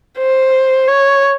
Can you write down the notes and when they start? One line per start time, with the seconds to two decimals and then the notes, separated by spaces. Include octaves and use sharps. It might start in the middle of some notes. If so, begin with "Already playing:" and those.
0.19 C5
0.88 C#5